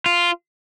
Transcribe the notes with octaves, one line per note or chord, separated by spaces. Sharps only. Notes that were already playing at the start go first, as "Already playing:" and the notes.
F4